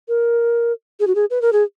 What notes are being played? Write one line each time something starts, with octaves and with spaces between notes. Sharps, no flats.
A#4
G#4
F#4
G#4
B4
A#4
G#4